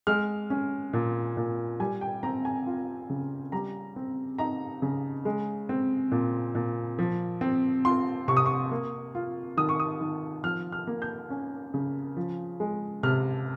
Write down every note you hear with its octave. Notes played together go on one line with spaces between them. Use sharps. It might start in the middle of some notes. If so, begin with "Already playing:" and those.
G#3 F6
C#4
A#2
A#2
G3 G#5
G5
C4 A#5
G#5
F4
C#3
G3 A#5
C4
D#4 A#5
C#3
G#3
C4
A#2
A#2
F3
C4
F4 C6
C3 C#6
D#6
C#6
A#3
F4
D#3 D#6
C#6
D#6
D#3
F3 F6
F6
A#3
G6
C#4
C#3
F3
G#3
C3 F6